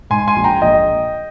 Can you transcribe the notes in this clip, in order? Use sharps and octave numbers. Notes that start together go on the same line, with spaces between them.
G#2 G#5 C6
G#5 C6
A#1
G5 A#5
A#1 D#5 G5